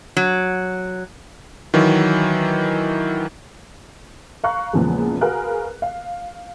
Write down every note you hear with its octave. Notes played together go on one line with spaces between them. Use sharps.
F#3
D#3 E3 F#3
F5 A#5 C#6 F#6
E2 A#2 C#3 F3 G#3
F#4 G#4 A#4 B4 F5 F#6
F5